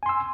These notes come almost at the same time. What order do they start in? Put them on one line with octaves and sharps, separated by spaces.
G#5 C6 E6